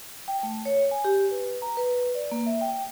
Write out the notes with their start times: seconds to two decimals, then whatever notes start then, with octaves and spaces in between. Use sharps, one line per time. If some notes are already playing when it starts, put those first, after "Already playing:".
0.28 G5
0.43 A3
0.65 C#5
0.91 G#5
1.05 G4
1.31 B4
1.62 A#5
1.77 B4
2.15 D5
2.31 A#3
2.46 E5
2.61 G5